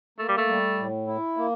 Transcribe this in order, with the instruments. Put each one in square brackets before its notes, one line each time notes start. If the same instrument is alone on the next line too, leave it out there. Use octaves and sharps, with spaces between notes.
[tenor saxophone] A3 [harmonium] A#3
[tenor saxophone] G3
A3
[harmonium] G3
A2
E4
A#3